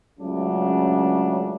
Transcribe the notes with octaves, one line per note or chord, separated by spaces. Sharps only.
C#2 C#3 F#3 A3 D4